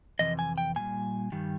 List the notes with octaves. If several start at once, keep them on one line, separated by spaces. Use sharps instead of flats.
F2 C3 E3 D#5
G#5
G5
A#2 G3 G#5
G2 D#3 G3